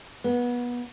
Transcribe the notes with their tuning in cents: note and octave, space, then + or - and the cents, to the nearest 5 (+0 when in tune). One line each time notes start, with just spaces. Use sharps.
B3 -25